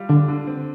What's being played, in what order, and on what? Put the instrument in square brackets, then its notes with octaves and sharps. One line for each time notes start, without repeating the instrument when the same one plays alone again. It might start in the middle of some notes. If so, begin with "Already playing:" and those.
Already playing: [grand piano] G3 F4
[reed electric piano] D3 [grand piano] D4
[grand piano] D3
C4